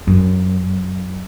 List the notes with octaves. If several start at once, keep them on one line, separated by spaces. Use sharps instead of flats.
F#2